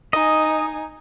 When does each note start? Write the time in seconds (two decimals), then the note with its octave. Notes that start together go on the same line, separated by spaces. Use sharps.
0.13 D#4 D#5 G#5